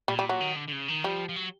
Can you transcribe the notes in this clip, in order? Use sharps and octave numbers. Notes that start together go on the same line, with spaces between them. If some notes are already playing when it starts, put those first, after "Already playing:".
A#2 G3
G3
F#3
D#3
D3
D3
C#3
D#3
F3 G3
F3
F#3